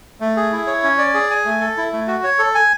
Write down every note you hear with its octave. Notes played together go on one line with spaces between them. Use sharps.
A3
G#4
E4
C#5
C#4
D5
G#4
G#5
A3
A4
E4
A3
F#4
C#5
A4
G#5